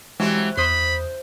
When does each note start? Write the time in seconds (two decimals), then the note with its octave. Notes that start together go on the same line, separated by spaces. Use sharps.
0.20 E3 F#3 G#3 C4 G4
0.57 E2 C5 B5 D#6